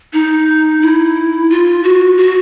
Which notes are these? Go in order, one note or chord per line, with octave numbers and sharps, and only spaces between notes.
D#4
E4
F4
F#4
F#4